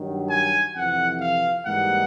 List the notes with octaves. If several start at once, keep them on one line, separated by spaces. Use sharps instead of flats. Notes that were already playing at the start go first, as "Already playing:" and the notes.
Already playing: G2 D#3 F#3
G#5
F2 C3 E3 F#5
F5
G#2 E3 G3 A#3 D#4 F#5